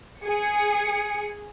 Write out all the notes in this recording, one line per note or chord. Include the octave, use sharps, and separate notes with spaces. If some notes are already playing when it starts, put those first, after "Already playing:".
G#4 C#7